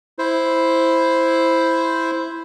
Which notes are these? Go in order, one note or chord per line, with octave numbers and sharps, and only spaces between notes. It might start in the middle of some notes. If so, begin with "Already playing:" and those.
E4 C5